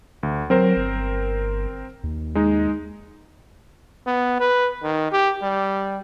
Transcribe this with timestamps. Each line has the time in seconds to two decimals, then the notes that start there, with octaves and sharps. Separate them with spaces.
0.23 D2
0.50 F#3 C4 A#4 C5
0.77 G1
2.04 D#2
2.35 G#3 D#4
4.07 B3
4.40 B4
4.83 D#3
5.12 G4
5.42 G3